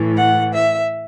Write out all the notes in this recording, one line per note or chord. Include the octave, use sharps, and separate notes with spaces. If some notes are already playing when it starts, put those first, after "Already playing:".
Already playing: A2 E3
F#5
E5